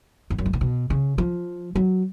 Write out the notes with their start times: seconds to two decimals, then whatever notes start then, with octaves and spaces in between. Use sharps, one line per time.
0.30 F2
0.38 F#2
0.46 G#2
0.53 A#2
0.61 B2
0.90 C#3
1.18 F3
1.76 F#3